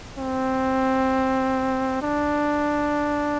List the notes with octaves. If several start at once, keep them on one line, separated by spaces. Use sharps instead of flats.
C4
D4